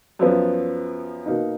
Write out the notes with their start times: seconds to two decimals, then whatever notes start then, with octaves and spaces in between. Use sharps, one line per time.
0.19 F#2 F3 B3
1.26 B2 A#3 D#4